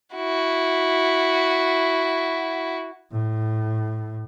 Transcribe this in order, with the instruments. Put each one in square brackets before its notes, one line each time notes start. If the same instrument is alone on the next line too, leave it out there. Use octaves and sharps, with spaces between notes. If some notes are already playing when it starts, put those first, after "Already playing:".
[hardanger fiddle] E4 F#4
[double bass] A2